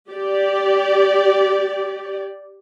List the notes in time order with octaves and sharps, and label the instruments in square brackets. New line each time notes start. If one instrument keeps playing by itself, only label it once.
[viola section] G4 D5